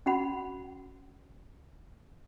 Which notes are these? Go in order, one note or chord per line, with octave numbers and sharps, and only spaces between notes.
C#4 F#4 F#5 B5